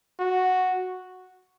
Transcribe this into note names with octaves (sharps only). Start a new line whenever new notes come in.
F#4